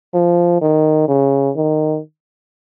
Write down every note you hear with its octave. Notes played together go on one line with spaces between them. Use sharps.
F3
D#3
C#3
D#3